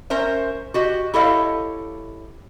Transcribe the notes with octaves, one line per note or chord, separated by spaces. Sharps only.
C#4 A#4 C5 E5
F#4 G4 D#5
E4 G4 A4 C#5 D#5 F5